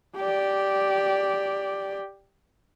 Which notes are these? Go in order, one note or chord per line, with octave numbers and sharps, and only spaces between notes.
G4 D5